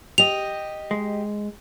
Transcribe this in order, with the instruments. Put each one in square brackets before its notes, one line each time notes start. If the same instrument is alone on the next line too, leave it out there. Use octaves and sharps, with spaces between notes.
[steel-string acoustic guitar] G4 D#5 [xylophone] F7
[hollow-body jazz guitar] G#3